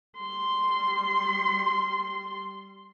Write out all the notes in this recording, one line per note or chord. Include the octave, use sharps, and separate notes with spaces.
G3 C6